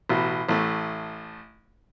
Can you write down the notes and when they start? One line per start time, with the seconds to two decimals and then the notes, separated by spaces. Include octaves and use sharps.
0.09 A1 B2
0.49 A1 A3